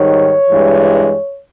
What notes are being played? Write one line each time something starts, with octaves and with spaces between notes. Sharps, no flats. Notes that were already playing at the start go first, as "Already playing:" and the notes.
Already playing: G#2 D#3 G3 C#5
G2 E3 G#3